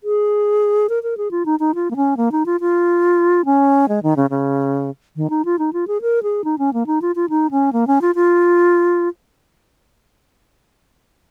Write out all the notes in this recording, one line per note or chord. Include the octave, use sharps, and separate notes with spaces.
G#4
A#4
A#4
G#4
F4
D#4
D#4
F4
A#3
C#4
A#3
D#4
F4
F4
C#4
G#3
D#3
C#3
C#3
D#3
D#4
F4
D#4
F4
G#4
A#4
G#4
D#4
C#4
A#3
D#4
F4
F4
D#4
C#4
A#3
C#4
F4
F4